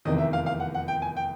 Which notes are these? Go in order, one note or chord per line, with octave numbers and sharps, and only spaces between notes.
F1 E2 C3 D#3 D#5
E5
F5
F5
F#5
F#5
G5
G#5
G5